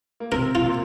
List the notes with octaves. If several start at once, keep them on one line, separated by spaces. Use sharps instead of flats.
A#3
C3 C4 A#4
F4
A#2 A#3